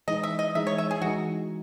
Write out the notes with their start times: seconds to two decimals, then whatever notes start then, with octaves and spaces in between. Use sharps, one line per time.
0.08 E3 G#3 D#4 D#5
0.23 E5
0.39 D#5
0.55 E3 G#3 D#4 E5
0.67 C#5
0.78 E5
0.91 G#4
1.01 E3 G#3 D#4 F#4